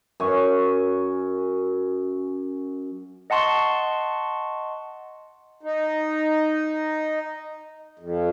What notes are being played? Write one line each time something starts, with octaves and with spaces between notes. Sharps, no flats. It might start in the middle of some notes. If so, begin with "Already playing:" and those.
F#2 G#5 C#6
D#5 F#5 A5 C6 C#6
D#4
F2